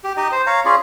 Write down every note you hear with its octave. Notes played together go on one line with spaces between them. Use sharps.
G4
D#4 G4 D#5
C5
C#5 F5 A#5
C#4 F4 G#4 D5